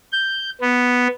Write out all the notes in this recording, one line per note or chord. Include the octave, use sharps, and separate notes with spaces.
G6
B3